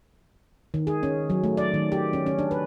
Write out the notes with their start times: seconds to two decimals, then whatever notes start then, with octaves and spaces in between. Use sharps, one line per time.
0.74 D#3
0.87 G#4
1.03 C#4
1.30 F#3
1.44 A3
1.57 D5
1.74 D#3
1.92 G4
2.13 C#4
2.26 C#4
2.39 D4
2.51 B4